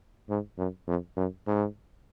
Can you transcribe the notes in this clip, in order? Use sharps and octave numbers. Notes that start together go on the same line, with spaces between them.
G#2
F#2
F2
F#2
G#2